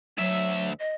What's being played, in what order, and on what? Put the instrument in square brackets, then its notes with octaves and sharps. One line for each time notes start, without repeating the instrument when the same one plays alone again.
[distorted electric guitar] D2 E5 [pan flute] F#3
[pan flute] D#5